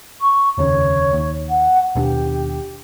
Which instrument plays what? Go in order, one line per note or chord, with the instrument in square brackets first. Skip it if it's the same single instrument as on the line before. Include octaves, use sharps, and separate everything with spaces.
[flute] C#6
[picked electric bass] F1 D#2 C#3 [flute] C#5
[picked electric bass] D#2
[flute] F#5
[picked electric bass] D#2 B2 D4 [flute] G4